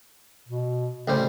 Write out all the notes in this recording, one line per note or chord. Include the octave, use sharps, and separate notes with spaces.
B2
A1 C#3 G3 C5